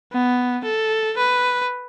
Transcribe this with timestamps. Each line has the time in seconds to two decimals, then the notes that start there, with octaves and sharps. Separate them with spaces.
0.13 B3
0.65 A4
1.17 B4